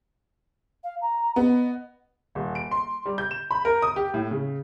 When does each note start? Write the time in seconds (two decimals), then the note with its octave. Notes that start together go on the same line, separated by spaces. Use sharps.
0.84 F5
1.01 A#5
1.36 B3 D#5
2.35 D#1
2.55 D7
2.71 C6
3.06 G3
3.18 G6
3.31 E7
3.51 B5
3.65 A#4
3.82 D#6
3.96 G4
4.14 A2
4.31 C#3